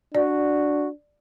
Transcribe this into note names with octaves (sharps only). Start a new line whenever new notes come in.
D4 F#4 D5